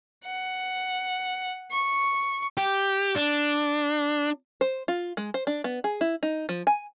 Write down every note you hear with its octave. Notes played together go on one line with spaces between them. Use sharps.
F#5
C#6
G4
D4
C5
F4
G#3
C5
D4
B3
G#4
E4
D#4
F3
G#5